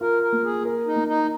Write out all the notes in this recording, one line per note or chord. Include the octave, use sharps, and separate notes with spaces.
F4 A#4
A#4
A#3
G#4
A#4
D#4
A#3
D#4